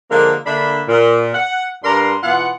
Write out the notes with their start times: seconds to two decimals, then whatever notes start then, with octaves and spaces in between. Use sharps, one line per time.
0.11 D3 F3 G#3 A#3
0.46 D3 A#3 D4 E5 B5
0.88 A#2
1.34 F#5
1.84 G2 D4 A#4 A#5 C6
2.23 B2 E3 F4 F#5